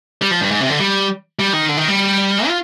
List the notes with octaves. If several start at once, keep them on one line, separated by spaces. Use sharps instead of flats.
G3
F3
G2
G#2
C3
D3
G3
G3
D#3
D3
D#3
G3
F4